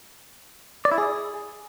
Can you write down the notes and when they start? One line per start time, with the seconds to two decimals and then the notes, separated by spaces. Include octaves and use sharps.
0.85 D5
0.92 E4
0.98 G#4